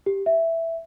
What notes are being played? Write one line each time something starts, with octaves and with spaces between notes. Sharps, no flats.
G4
E5